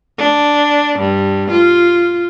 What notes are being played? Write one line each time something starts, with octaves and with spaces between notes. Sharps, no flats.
D4
G2
F4